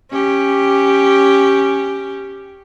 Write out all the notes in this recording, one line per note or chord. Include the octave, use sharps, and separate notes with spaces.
C#4 G4